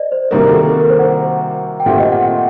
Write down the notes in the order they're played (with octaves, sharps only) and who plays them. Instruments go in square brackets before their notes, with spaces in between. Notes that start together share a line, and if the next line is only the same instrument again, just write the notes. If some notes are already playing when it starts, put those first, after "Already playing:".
Already playing: [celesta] C5 D5 D#5
C5
[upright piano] C3 D#3 G3 A#3 F#4 [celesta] A#4
[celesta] A4
A#4
A#4
C5
F#5
G5
[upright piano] A#2 A3 C4 G4 [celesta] F#5
[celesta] D#5
F#5